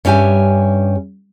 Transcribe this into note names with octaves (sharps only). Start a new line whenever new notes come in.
G2 C#4 G4 E5 G#5